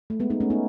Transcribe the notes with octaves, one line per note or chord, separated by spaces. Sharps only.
A3
G#3 B3
B3 D#4
A3 C#4
B3 D#4